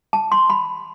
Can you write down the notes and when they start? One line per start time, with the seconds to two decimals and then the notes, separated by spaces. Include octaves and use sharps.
0.13 A5
0.32 C6
0.50 B5